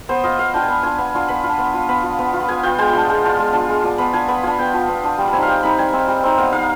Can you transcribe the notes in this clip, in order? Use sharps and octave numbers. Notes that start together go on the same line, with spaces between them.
B3 C5
F4 D#5
B3 F5
D4 F4 G5
G#5
B3 B5
D4 F4 G#5
B3 G#5
D4 F4
B3 B5
D4 F4
B3
F4
B3 B5
F4
B3
F4
B5
B3 G#5
F4 G5
G#3 G5
D4 F4
G#3
D4 F4
G#3
D4 F4
G#3
D4 F4
B3 B5
D4 F4 G#5
B3 B5
D4 F4 G#5
B3 G5
D4 F4
B3
D4 F4
G3
B5
C4 D#4 G#5
F5
G3 G5
C4 D#4 B5
G3 G#5
C4 D#4
G3
C4 D#4
B3 F5
D#4 F5